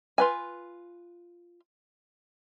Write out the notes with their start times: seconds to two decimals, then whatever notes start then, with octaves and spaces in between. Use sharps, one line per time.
0.18 F4 B4 G#5